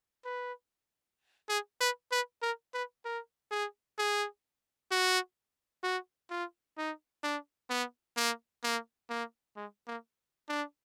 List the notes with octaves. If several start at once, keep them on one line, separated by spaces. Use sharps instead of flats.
B4
G#4
B4
B4
A#4
B4
A#4
G#4
G#4
F#4
F#4
F4
D#4
D4
B3
A#3
A#3
A#3
G#3
A#3
D4